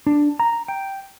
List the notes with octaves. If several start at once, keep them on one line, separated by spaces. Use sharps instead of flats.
D4
A#5
G5